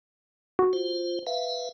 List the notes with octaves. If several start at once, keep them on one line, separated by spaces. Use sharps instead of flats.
F#4
F4 C5
B4 E5 F5